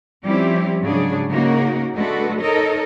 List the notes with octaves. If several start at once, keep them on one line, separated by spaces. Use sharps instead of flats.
F3 G3 C4 C#4 E4 G4
G#2 C#3 F#3 D4 G#4
C#3 A#3 D#4 F#4 A#4
G#3 A3 D4 F#4 A4 B4
D#4 A4 A#4 C#5 D#5